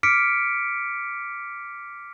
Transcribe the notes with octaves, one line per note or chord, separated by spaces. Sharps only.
D6 F6 B6 C#7 D7